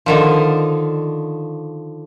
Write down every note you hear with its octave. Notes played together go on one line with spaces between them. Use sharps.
D3 D#3 F3